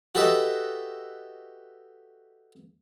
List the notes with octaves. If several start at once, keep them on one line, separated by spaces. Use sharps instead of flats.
F#4 G4 A4 B4 D#5 E5